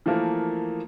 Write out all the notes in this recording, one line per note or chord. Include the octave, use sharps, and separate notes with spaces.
E3 F3 A3 A#3 A#4